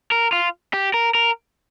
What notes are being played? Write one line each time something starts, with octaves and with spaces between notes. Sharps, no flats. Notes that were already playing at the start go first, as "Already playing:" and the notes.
A#4
F4
G4
A#4
A#4